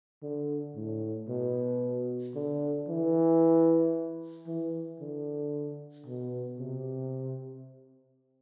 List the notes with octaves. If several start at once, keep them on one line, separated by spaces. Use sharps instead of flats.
D3
A2
B2
D3
E3
E3
D3
B2
C3